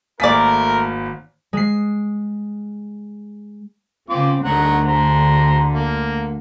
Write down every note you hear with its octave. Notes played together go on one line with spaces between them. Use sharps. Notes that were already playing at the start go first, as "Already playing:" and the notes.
G#1 A3 A#3 G#4 A#4 D5 B6
G#3 C7
C#3 C4 F4 D6
D2 D3 D#3 F#5 A#5
C5 A#5
A#3